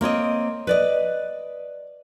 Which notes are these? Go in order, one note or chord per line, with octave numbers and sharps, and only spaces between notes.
A#3 C4 C#5 D#5
B4 D5 D#5